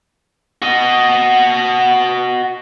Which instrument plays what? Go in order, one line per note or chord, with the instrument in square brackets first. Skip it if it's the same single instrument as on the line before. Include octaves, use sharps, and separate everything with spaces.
[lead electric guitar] F#4 D#5